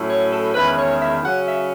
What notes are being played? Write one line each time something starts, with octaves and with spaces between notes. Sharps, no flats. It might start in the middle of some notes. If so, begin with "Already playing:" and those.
Already playing: A2 F#3 C#4 E4
C#5
A4
E2 D#3 G#3 C#4 E4 B4
C#5
E5
C#3 F#3 C#4 F#5
E5